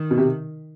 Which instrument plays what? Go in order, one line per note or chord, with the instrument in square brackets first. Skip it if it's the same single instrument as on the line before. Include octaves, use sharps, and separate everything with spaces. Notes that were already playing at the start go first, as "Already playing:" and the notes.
Already playing: [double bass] D#3
[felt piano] B2
C3